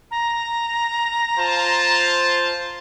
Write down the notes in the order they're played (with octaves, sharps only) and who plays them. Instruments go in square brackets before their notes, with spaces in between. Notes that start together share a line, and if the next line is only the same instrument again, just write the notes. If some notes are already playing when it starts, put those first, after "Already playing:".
[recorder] A#5
[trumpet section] F4 C5 A5